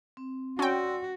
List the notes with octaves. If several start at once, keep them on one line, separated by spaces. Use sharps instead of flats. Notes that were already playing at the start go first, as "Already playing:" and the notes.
C4
C#4 F#4 D5 G5 C6 E6